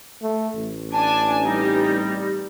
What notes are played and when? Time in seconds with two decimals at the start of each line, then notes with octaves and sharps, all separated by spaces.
0.22 A3
0.55 A1
0.93 D4 G#5 A5
1.44 G2 G3 C4 D#4